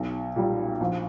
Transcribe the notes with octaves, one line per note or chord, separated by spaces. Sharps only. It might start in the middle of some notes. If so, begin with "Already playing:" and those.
Already playing: B1
A#2 G3
A#1